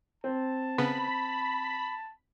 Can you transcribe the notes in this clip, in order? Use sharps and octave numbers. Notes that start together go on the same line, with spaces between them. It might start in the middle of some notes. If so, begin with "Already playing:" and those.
C4 A5
C#3 B3 B5